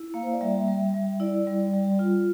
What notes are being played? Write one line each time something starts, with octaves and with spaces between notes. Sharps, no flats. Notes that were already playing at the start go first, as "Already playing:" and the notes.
Already playing: E4
A#3 F5
C5
D5
G3 E5
G3
G3
E4 D5
G3
G3
F4